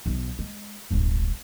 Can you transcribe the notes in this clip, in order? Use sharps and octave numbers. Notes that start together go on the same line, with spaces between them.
B1 E2
G#3
D1 G1